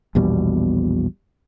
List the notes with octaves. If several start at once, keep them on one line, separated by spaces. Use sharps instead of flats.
A#1 E2 B2 G3